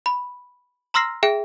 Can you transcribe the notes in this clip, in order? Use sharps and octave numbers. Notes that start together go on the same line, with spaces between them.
B5
A#5 C6 E6 F6 A#6 C7
G#4 E5 G5 D7